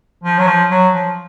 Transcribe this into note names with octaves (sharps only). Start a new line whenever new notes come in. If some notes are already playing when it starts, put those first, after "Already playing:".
F3
F#3
F3
F#3
F3